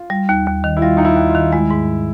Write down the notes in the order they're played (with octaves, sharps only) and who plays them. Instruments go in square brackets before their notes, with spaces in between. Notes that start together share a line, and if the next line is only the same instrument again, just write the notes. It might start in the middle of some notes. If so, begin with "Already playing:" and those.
Already playing: [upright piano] F4
[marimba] G3
D#2
D#2
D#3
[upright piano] E4
[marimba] G3 [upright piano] F4
[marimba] D#2 [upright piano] D#4
[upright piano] E4
[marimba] D#2
[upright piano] F4
[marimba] D#3
[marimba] G#3 [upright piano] E4
[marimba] G#2